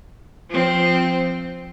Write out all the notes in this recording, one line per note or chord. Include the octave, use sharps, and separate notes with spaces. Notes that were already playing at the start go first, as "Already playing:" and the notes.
F3 C4